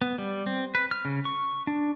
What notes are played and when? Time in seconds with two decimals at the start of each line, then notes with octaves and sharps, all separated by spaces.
0.02 B3
0.18 G3
0.46 C4
0.75 B4
0.91 F6
1.05 C#3
1.25 C#6
1.67 D4